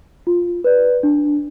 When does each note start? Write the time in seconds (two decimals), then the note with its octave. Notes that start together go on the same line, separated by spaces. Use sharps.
0.27 F4
0.64 B4 D5
1.03 D4